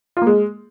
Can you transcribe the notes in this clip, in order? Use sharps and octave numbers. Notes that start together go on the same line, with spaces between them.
F4
A#3
G#3